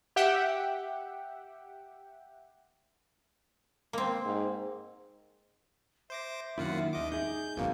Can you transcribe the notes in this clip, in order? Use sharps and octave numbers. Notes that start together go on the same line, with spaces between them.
G4 E5 F#5 G5
A#3 C4
G#2
C5 E5 D6 A#6
F#2 D#3 A#3 E4 F4 F#5
D#2 D#5 D6
D#4 G#4 G6
G#1 F#2 B2 A#3 F#4